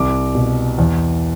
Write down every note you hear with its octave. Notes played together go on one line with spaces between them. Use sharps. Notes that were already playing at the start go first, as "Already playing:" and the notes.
Already playing: C2 D6
B2
E2